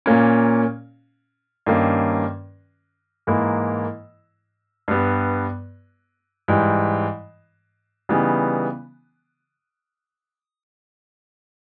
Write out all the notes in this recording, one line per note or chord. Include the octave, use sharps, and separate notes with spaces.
A#2 A#3 C#4
G2 D#3 A#3 C#4
G#2 E3 A#3 E4
G2 G3 B3
G#2 E3 G3
C#3 E3 G3 B3 D#4